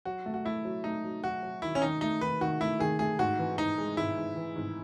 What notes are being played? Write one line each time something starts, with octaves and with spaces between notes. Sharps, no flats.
F#3 F#4
A3
F#4
A3 E4
F#3
A3 D#4
F#3
F#3 F#4
F#3
D#3 E4
C#4
D#3 D#4
A3 D#4
D#3 B4
D#3 F#4
A3 E4
D#3 G#4
A3 G#4
G#2 F#4
E3
G#2 D#4
G#3
G#2 E4
G#2
E3
G#2